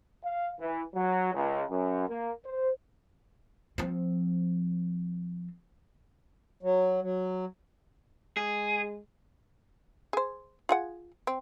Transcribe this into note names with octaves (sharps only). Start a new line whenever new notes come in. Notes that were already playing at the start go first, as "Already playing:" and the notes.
F5
E3
F#3
C#2
F#2
A#3
C5
F3 C4
F#3
F#3
G#3 G#4
G#4 C5
F4 G#4 F#5
C4